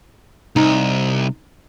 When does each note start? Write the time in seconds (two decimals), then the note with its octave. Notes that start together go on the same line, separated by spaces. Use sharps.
0.56 C2 D#4